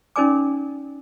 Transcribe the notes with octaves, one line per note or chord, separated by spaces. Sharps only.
C#4 D#4 A#4 D5 G#5 D6